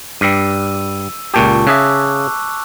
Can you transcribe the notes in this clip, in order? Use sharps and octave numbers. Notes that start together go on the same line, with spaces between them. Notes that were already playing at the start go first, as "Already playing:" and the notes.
G2 G3 E6 D#7
C#2 A#2 G4 A5 C#6
C#3 G#4 E5 D6 E6 F#6